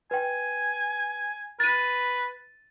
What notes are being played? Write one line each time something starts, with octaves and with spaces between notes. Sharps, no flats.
B4 G5 G#5
B4 A6 D#7